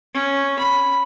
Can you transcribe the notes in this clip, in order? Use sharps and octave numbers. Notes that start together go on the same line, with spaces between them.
C#4
B5